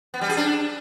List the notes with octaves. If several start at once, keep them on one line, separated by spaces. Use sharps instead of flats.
B3
G3
G#4
D4